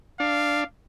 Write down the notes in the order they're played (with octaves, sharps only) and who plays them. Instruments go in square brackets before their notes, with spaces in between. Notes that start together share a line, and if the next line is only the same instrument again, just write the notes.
[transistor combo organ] D4 [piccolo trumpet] F5